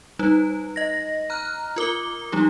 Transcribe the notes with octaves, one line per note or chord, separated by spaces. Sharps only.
G3 D#4 B4
D#5 A#6
A#5 F6 F#6
F4 A#4 D6 G7
F3 G3 D#4 G4